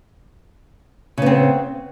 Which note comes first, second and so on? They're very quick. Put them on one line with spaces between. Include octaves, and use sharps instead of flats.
C#3 B3 C4